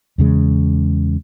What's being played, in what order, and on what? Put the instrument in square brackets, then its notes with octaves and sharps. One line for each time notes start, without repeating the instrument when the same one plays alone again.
[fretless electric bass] E2 C#3 G#3